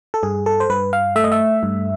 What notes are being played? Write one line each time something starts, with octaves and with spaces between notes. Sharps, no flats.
A4
G2 G#4
A4
C5
G2 B4
F5
A3 E5
D#5
E5
G2